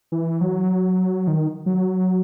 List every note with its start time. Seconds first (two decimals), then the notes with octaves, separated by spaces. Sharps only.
0.12 E3
0.41 F#3
1.28 D#3
1.66 F#3